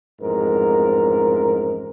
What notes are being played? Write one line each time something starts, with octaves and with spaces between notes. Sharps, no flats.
A1 F2 G#2 A#4